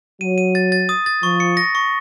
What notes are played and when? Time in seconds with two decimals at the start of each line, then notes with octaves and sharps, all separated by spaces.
0.21 F#3 D#7
0.38 D#7
0.55 A6
0.72 A6
0.89 D#6
1.06 A6
1.23 F3 C#6
1.40 C#7
1.57 A#6
1.75 C#6